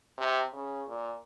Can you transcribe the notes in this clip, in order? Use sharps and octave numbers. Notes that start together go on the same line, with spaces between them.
C3
C#3
A#2